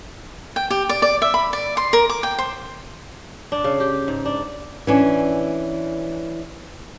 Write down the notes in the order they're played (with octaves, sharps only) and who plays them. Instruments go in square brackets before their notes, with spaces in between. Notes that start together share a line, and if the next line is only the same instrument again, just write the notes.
[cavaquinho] G5
G4
D5
D5
E5
B5
D5
C6
A#4
D6
G5
C5
[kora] D4
C#3
G4
G#2
D4
[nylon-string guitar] E3 C#4 D4